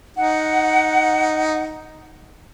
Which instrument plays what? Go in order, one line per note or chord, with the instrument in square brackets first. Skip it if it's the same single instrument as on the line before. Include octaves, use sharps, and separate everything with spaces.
[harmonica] D#4 [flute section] F#5